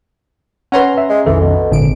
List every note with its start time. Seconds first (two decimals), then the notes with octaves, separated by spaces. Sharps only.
0.72 C#4 B4 C#5 F#5 A#5 C6
0.98 E5
1.09 G#3
1.26 B1 F2 D#3 E3 A4
1.40 B2
1.71 G#1 A#2 D3 D7